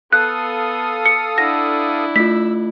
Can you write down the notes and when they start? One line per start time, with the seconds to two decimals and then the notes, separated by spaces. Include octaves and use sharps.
0.12 B3 A4 F5 D#6 F#6
1.06 C#7
1.38 D4 E4 F#5 E6 A#6
2.16 A3 F4 E6 B6